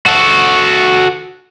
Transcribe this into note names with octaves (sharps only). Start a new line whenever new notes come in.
F#4 A4